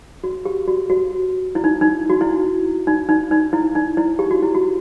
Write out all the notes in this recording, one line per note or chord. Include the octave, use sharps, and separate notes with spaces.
F#4
G4
F#4
F#4
E4
D#4
D#4
F#4
E4
D#4
D#4
D#4
E4
D#4
E4
G4
F#4
E4
F#4